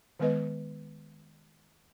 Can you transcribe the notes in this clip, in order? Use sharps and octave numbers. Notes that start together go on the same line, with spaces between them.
D#3 G#3 B3 B4 D#5